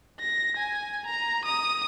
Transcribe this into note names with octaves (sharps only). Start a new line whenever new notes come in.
A#6
G#5
A#5
D#6